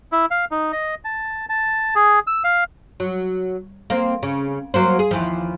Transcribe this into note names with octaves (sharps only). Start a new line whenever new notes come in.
E4
F5
D#4
D#5
A5
A5
G#4
E6
F5
F#3
A#3 C4
C#3
F#3 A#3 C5
G#4
D#2 E3 F3